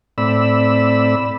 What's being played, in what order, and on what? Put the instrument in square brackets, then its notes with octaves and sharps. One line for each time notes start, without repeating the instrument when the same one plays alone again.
[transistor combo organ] A2 C4 D5 B5 E6